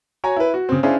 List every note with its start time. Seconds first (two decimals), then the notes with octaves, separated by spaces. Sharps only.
0.24 F#4 C#5 G#5 A#5
0.36 E4 B4
0.54 F#4
0.69 C#3 C4
0.83 C#4 D4 E4 G#4 C5 F5